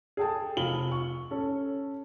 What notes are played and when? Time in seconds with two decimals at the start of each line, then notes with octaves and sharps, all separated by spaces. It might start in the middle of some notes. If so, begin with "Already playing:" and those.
0.17 G#4 A4 G5 A5
0.57 F1 F4 B5 F#7 G7
0.92 C#6
1.31 C#4 A4